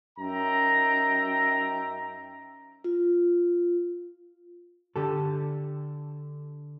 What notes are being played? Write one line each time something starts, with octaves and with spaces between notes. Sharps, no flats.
F#2 D#4 E5 G5 A#5
F4
D3 G4 A4